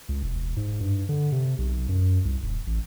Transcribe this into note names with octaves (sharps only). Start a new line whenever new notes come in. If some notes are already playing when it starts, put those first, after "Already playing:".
C#2
E1
G#2
G2
D3
C3
B1
F#2
C2
D#1
A1